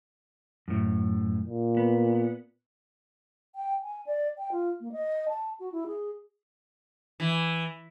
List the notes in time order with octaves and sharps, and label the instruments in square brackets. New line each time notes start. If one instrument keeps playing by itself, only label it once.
[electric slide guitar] F#2 A2
[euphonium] A#2
[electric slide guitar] B3
[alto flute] G5
G#5
D5
G5
F4
A#3
D#5
A5
F#4
E4
G#4
[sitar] E3